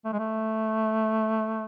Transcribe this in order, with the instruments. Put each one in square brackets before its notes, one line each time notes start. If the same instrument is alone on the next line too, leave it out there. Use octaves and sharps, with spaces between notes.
[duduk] A3
G#3
A3